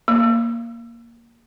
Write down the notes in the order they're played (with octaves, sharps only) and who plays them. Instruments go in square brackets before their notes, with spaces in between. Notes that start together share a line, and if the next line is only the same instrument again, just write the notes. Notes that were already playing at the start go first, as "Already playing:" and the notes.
[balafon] A#3